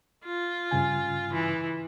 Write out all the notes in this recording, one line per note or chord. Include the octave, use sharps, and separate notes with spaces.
F4
G2 C#3 G#5
E3